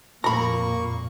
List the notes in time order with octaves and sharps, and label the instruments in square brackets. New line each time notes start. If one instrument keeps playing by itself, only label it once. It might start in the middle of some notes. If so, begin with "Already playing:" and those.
[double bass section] F2 A#2 [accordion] A#3 C#6 [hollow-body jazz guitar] A#5 B5